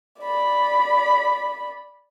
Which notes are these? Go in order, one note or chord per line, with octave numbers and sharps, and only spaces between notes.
D5 B5